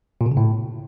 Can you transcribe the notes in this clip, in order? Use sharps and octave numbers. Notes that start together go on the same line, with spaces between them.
A#2
B2
C#3
A2